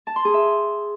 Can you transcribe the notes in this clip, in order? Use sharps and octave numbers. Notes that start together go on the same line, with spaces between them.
A5
C6
G#4
E5